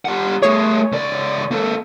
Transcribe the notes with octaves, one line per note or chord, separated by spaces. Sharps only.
G3 F#5
A3 G#4 C#5
C#2 D5
A#3 A4